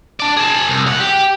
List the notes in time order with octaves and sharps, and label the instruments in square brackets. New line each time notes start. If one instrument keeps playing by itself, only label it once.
[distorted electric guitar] D4 D5
G#4 A5
C2
E2 F#5
G4 G5